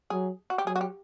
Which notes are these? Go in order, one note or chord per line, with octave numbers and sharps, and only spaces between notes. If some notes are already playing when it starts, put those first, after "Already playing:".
F#3 G#4
F#4
G4
F#3 G#4
F#4
G4